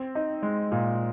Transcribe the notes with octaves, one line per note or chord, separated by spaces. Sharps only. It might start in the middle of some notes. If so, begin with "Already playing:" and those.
Already playing: C4
D#4
G#3
A#2